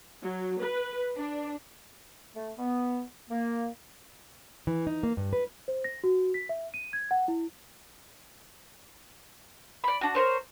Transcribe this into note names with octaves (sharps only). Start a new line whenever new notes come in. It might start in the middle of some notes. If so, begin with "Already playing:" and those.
F#3
B4
D4
A3
B3
A#3
E3
D#4
A#3
G2
B4
C5
A#6
F#4
B6
E5
D#7
G#6
F#5
E4
D5 B5
D4 F#4
A#4 C5 C#5